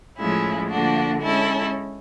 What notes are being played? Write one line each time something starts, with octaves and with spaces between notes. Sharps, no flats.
A2 F3 G#3 C#4 E4
D3 F3 A#3 D4 F#4
G#3 C#4 E4 A4